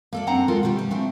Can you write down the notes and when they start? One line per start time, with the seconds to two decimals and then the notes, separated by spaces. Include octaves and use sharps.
0.13 A#3 A4 D5
0.27 F#2 A#3 C4 D4 F#5 A#5
0.48 G#3 A#3 F4 A4 A#4
0.63 B2 D#3 G3 G4
0.79 G3
0.90 F3 G#3 A3 C4 D4 E4